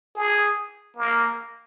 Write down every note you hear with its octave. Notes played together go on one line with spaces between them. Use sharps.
G#4
A#3